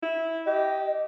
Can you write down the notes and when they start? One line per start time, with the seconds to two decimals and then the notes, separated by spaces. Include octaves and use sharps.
0.03 E4
0.47 G4 D#5